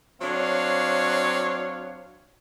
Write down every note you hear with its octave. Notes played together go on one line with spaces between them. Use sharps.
F#3 C4 D4 C#5 F5